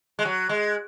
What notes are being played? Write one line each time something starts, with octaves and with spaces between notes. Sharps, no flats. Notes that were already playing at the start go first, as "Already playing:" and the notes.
G#3
F#3
G#3